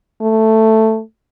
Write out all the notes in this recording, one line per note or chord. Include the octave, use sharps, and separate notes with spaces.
A3